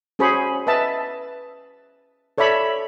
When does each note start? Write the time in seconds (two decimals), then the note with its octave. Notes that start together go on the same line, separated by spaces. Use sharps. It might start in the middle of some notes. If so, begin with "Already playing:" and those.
0.19 C#4 F#4 G#4 C5 B5 C#6
0.67 B4 D#5 E5 A5
2.38 A4 C#5 D5 E5 B5